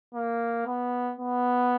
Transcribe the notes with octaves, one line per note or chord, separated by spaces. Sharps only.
A#3
B3
B3